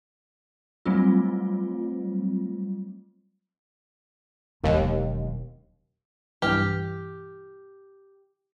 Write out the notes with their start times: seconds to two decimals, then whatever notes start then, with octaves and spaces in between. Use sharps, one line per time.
0.86 F#3 G3 A3 C4 F4
4.64 E1 D#2 F#3
6.42 B1 G2 E3 G4 F6